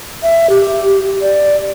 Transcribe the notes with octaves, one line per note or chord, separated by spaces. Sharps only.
E5
G4
D5